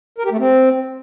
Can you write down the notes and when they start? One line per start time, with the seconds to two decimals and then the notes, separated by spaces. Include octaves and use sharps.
0.18 A#4
0.25 G4
0.32 A3
0.39 C4